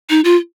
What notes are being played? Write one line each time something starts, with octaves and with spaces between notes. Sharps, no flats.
D#4
F4